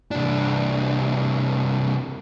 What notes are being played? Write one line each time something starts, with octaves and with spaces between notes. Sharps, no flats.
C2 D4